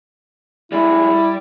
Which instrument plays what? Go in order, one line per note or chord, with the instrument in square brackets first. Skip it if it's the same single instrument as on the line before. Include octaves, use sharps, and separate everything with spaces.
[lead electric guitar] G3 G#3 [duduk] E4
[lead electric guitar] G3